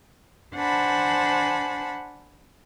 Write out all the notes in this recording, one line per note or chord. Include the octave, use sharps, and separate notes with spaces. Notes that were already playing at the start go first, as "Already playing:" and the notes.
D4 C5 F#5 G#5 A5 B5